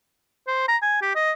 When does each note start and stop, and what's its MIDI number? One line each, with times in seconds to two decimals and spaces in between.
0.47 0.65 72
0.68 0.77 82
0.82 0.99 80
1.02 1.10 67
1.15 1.32 75